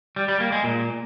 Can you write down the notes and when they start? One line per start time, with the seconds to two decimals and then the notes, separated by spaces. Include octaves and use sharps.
0.16 G3
0.28 G3
0.40 A#3
0.52 G#3
0.64 A#2